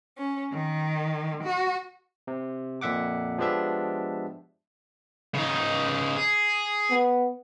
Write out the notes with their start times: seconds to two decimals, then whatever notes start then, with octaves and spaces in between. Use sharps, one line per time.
0.16 C#4
0.53 D#3
1.44 F#4
2.27 C3
2.81 F2 A#2 E5 F#5 D6
3.38 F3 G#3 B3 D4 G4 E5
5.35 C#3 D#4
6.17 G#4
6.90 B3